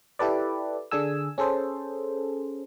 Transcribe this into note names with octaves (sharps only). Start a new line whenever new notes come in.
E4 G4 A4 B4 D5
D3 D4 G#4 G#5 E6
C#4 G#4 A4 C5